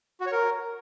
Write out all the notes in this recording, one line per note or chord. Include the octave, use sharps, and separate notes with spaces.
F#4
C#5
A#4